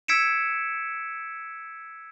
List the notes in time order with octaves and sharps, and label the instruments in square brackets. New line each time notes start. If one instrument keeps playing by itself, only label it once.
[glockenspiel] E6 G#6 B6 C#7 D7 E7